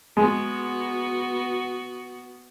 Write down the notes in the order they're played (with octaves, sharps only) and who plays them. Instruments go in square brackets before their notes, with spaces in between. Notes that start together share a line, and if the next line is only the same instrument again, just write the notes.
[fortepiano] G#3 [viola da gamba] B3 F#4